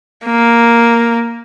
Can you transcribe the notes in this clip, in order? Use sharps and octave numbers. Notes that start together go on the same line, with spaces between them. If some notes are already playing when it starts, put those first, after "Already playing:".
A#3